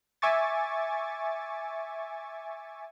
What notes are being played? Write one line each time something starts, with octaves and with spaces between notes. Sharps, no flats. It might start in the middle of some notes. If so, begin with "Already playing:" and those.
E5 G#5 C#6 D6 A6